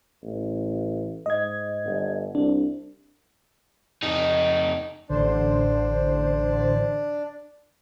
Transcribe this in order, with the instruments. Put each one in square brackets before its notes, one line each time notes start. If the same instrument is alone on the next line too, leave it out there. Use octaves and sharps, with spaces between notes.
[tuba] A1
[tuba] G#2 [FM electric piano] D#5 G#6
[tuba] G1
[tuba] C2 [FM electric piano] D4
[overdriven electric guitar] F2 D#4
[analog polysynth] A1 D3 C5 [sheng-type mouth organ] D4